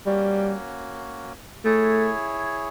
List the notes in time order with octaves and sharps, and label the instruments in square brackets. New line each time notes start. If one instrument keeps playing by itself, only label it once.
[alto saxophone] G3 [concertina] A#3 C#4 F#4
[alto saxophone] A3 [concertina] E4 G#4 C#5